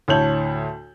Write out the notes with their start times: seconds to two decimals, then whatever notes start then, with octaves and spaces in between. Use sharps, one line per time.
0.08 D2 A2 C#5 A5 G6 F#7